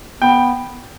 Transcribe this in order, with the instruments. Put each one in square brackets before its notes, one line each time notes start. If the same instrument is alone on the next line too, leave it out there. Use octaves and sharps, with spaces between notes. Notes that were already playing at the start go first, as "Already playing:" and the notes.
[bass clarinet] B3 [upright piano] G5